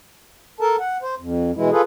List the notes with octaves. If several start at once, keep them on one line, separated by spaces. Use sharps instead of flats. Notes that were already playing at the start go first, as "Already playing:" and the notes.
A4 A#4 A5
F#5
C5
F2
B2 E3 G#3 E4
F4 G#4 A4 B4